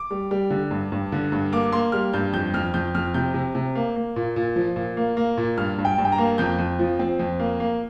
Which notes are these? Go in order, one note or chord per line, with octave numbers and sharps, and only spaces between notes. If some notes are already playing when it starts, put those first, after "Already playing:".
Already playing: D6
G3
G3
D3
G2
G2
D3
G2
A#3 D6
A#3 C6
G3 F6
G2 G6
F2 G6
F2 F6
F2 G6
F2 F6
C3 G6
C3
C3
A#3
A#3
A#2
A#2
F3
A#2
A#3
A#3
A#2
G2 F6
G2
G5
G2
G5
A#5
A#3
F2 G6
F2
F3
C4
F2
A#3
A#3